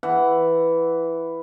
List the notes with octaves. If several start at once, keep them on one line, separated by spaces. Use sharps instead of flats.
E3 F#5